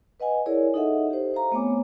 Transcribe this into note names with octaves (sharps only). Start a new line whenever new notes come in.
B4 D#5 F#5 G#5
E4 G#4 A#4 C#5 D5
D#4 G#4 A4 D#5 E5 F#5
G4 C5
C5 F5 A#5
A3 B3 C4 C#5 G#5 D6